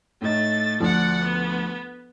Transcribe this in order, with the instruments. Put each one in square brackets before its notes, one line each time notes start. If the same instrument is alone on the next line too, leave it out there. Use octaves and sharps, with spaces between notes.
[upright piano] A2 D#4 [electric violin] A3 A6
[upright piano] D2 F3 [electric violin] D5 F#5
[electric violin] B3